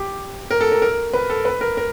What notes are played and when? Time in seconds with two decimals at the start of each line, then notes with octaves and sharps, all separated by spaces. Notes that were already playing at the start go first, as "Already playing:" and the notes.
Already playing: G4
0.51 A#4
0.61 A4
0.72 A#4
0.82 A#4
1.13 B4
1.30 A4
1.45 B4
1.61 A#4
1.77 A#4